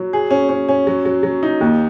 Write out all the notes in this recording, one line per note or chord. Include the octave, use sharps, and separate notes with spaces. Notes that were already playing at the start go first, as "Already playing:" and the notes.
Already playing: F#3
G#4
C#4
C#4
C#4
F#3
F#3
F#3
D#4
D#2